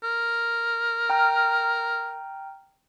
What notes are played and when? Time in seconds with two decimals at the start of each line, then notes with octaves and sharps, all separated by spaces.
0.03 A#4
1.10 G5 A#5 F6